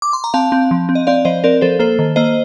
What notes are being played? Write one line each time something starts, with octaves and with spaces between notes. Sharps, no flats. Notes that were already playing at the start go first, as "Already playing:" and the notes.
D6
C6
A#5
C4 F5 A5
C4
F3
C4
D#5
C4 D5 F5
F3 C5 D#5
C4 A#4 D5
F3 A4 C5
A#3 A4 C5
D#3
A#3 C5 D#5